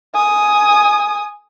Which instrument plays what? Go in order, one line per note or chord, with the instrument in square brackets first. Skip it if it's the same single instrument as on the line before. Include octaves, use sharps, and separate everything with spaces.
[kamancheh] G#5 D#6